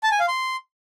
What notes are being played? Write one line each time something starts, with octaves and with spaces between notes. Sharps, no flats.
A5
G#5
F5
C6